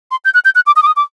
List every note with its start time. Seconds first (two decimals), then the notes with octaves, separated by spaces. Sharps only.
0.11 C6
0.25 G6
0.34 F#6
0.45 G6
0.55 F#6
0.67 D6
0.76 D#6
0.83 D6
0.87 D#6
0.96 D6